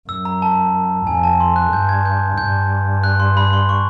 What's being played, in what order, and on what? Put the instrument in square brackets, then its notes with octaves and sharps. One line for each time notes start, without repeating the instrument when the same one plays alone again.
[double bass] F#2 [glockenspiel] E6
[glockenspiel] A#5
A5
[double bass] F2 [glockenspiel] G#5
[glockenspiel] A5
C6
F#6
[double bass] G2 [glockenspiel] G6
[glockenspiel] G#6
G6
[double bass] G2 [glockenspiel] G6
[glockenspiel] F#6
C6
B5
C6
C#6